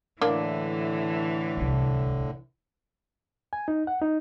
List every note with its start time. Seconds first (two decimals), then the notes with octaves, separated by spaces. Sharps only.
0.21 A2 D3 E3 A#3 D4 D5
1.57 D1 C2
3.53 G#5
3.68 D#4
3.87 F#5
4.02 D#4